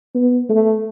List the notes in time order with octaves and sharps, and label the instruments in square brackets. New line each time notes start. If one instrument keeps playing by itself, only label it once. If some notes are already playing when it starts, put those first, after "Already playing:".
[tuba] B3
A3